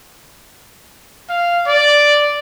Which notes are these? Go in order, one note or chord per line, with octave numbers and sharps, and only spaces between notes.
F5
D5